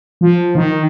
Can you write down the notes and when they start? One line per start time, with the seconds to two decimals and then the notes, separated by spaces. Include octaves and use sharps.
0.21 F3
0.55 D#3